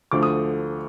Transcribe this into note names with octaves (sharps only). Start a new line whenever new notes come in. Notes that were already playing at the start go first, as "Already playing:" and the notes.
D2 D3 F3 D6
D#6